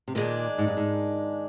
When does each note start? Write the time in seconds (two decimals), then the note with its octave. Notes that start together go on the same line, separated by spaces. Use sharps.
0.08 C3
0.15 A#2 D#3 G#3 D4
0.58 G#2
0.67 G2
0.77 G#2